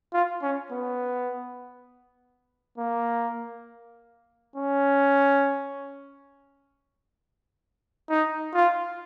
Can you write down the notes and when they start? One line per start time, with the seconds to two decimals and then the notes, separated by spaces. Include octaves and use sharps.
0.14 F4
0.43 C#4
0.71 B3
2.78 A#3
4.56 C#4
8.10 D#4
8.55 F4